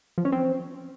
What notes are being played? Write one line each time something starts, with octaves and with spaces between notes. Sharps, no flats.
F3
C#4
C4